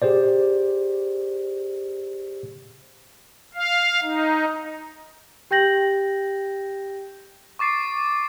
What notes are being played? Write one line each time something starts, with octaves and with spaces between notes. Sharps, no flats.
G4 G#4 C5 D5
F5
D#4
G4 G5 G6 A#6 F#7
C#6 D6 A6 C7 D7